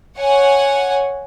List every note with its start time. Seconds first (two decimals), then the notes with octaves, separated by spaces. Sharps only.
0.18 C#5 F#5 G#5